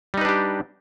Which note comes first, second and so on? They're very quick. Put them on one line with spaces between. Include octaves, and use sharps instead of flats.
G3 D#4 B4 D4 G4